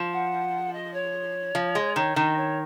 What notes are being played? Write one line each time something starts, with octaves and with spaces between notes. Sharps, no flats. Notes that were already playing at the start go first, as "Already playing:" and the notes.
Already playing: F3
F#5
D#5
C#5
F3
G#3
D#3 C#5
D#3 D#5
C#5